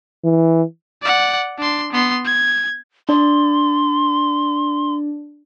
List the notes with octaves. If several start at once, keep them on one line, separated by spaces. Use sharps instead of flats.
E3
D5 F#5
D4 C6
B3 C6
G#6
D4 D5 C6